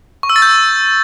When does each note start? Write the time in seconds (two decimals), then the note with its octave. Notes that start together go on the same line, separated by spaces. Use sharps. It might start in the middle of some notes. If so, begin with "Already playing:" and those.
0.23 C#6
0.30 E6
0.36 A6
0.42 G6